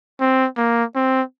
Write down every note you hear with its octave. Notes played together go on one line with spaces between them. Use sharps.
C4
A#3
C4